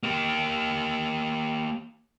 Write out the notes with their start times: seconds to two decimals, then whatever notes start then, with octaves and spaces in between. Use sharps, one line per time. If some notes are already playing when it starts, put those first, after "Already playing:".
0.03 A#3 G4